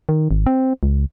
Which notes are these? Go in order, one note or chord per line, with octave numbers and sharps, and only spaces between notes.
D#3
G#1
C4
C#2